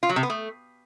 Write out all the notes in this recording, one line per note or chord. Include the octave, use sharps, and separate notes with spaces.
F4
F#3
C3
B3
A3